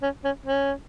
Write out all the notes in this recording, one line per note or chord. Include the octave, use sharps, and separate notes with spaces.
C#4
C#4
C#4